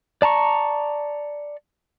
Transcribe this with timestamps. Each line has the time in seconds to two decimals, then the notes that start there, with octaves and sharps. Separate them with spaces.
0.22 D5 A5 A#5 C#6